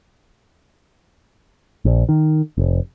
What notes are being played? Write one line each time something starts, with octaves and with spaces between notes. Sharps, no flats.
A#1
D#3
F1